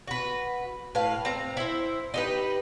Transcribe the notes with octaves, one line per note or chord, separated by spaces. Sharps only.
F#4 B4
A2 B4 F5
C4 A#5
E4 C5
D#4 G4 B4